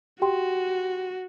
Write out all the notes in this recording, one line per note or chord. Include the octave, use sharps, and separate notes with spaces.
F#4 G4 G5 C6